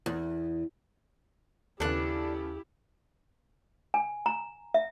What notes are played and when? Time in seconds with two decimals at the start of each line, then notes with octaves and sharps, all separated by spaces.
0.06 E2
1.80 D#2 C#3 B3 D4 E4 G4 A4 F#6
3.94 G#5
4.26 A#5
4.74 E5